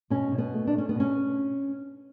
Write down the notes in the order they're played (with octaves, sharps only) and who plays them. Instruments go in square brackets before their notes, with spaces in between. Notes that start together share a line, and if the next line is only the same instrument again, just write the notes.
[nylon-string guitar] B2 C#4
B2
B3
A3
D4
A3 C#4
B3
B2 C#4